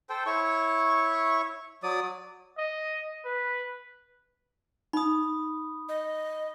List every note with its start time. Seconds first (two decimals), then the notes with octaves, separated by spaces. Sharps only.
0.09 A4 C5 G5
0.26 E4 C#5 C#6
1.83 F#3 D5 D#6
2.58 D#5
3.25 B4
4.93 D#4 B5 D#6
5.89 D#5